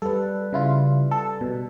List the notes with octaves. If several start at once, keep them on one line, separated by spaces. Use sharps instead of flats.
G3 A4 B4
C#3 E4 F4
A4
B2